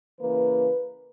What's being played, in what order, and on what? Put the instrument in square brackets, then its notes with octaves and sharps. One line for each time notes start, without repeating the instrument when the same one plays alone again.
[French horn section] C#3 E3 A#3 B4